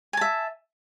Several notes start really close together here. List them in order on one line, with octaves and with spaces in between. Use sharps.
G#5 A5 E5